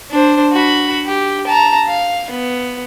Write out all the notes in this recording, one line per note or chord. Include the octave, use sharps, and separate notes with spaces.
D4 C5
F#4 B5
G4
A5 A#5
F5
B3